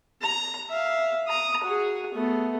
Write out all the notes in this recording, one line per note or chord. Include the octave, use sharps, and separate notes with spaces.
A#5
E5 F5
A#5 D#6
F#4 G#4
A3 B3